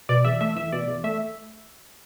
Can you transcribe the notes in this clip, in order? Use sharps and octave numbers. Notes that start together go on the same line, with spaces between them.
B2 D5
E2 E5
A3 E5
E2 E5
B2 D5
E2
A3 E5